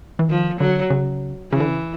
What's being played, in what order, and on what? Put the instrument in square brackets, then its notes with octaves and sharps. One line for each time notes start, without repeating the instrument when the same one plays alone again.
[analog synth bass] E3
[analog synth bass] D#3 [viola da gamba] F3
[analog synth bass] D3 [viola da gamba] F#3
[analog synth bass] C#3
[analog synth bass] C#3 [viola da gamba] E3
[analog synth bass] D3
C#3